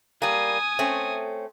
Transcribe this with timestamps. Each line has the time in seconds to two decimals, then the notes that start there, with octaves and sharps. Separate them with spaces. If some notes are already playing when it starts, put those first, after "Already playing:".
0.22 G3 A#3 G#5 D#6
0.79 A3 C4 C#4